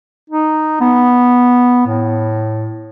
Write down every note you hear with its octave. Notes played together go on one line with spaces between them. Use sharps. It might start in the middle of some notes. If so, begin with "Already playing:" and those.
D#4
B3
A2